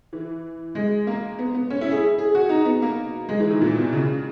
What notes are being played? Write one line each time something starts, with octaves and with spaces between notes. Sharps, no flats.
E3
G#3
A#3
B3
B3
C#4
E4
G#4
G#4
F#4
D#4
B3
A#3
G#3
E3
D#3
A#2
B2
C#3